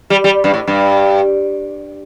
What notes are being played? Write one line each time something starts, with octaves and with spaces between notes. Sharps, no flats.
G3
G3
G2
A2
G2